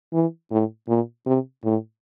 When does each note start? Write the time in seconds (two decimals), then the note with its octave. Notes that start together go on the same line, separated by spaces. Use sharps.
0.13 E3
0.52 A2
0.88 A#2
1.26 C3
1.64 A2